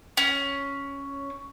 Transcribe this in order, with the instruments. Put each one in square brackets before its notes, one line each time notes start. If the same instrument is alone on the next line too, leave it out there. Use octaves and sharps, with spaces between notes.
[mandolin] C#4